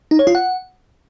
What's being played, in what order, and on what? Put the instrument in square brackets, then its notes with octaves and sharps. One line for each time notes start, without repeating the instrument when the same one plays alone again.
[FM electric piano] D#4
C#5
F4
F#5